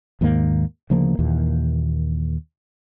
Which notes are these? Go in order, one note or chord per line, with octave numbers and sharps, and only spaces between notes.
D#2 G#2 D#3 A#3
D2 C#3 F3 A#3
D#2 A#2 E3